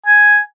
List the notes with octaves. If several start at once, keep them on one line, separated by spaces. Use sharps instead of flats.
G#5